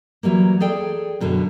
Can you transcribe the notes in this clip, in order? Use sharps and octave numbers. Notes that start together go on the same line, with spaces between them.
E3 F#3 G3 A#3
G#4 A4 D5 G5
F#2 B2 D3 C#4